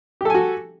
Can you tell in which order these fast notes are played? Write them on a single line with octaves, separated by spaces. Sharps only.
G4 A4 G#5 F#4